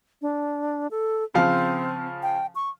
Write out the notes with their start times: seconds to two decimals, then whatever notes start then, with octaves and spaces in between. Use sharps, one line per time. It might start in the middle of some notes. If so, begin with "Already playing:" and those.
0.22 D4
0.91 A4
1.34 C#3 F3 C4 F5
2.23 G5
2.55 C#6